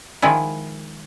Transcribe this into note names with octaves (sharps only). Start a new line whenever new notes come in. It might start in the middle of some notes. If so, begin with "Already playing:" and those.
D#3 F3 G#3 E4